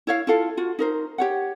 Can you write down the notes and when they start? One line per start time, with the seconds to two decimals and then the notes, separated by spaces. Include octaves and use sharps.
0.07 E4 C#5 F5
0.27 E4 F4 A4 F5
0.57 F4 F#4
0.79 D#4 A#4 C5
1.18 G4 C#5 F#5